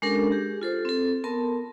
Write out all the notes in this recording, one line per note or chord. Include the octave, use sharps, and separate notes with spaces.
G#3 C#4 D4 G4 A4 A#4
G4 G#4
F4 A4 C5
C4 A4
B3 A#4 A5 C6